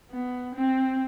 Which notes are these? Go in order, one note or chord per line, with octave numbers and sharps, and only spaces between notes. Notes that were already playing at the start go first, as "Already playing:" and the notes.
B3
C4